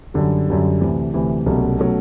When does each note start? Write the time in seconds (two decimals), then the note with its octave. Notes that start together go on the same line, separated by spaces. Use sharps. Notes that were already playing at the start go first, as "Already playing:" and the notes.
0.14 F#2 D3 G3
0.48 F#2 D3 G3
0.80 D2 C3 E3
1.13 D2 C3 E3
1.46 C2 B2 F#3 A3 C#4
1.79 B2 F#3 A3 C#4